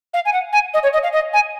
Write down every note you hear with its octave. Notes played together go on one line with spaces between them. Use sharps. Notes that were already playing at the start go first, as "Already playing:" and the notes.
F5
G#5
F#5
G#5
D#5
C#5
D#5
F5
D#5
G#5